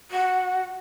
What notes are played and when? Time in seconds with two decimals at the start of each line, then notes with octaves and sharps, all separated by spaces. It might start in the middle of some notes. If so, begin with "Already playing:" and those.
0.10 F#4